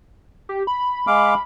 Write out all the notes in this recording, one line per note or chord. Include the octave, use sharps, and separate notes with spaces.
G4
B5
G#3 F5 D6